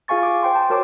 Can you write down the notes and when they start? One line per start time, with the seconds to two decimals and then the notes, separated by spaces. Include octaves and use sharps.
0.08 F4 G#4 F5 G#5 C#6 A6
0.23 D6
0.43 C5 G5 C6
0.55 A5
0.70 F#4 A#4 C#5 A5 C6 D6